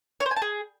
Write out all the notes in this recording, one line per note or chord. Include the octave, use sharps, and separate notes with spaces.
C#5
C5
G#5
A5
G#4